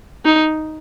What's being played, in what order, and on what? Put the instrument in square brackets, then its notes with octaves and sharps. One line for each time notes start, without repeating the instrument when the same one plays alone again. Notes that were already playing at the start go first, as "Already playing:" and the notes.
[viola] D#4